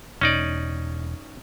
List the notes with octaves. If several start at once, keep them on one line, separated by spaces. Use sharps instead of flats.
E1 C#4 D#4 D5